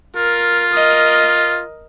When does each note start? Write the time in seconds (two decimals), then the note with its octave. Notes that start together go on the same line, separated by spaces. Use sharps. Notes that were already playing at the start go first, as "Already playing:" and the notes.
0.16 F4 A#4
0.74 A#4 D#5